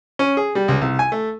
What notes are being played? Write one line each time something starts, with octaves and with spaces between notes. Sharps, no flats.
C#4
G#4
G3
C#2
C2
G#5
A3